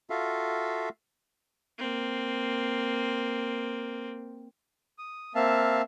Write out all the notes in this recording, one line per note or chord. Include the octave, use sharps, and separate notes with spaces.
F4 F#4 A4 E5 F5
A#3 C4
D#6
A#3 C4 E5 F5 A5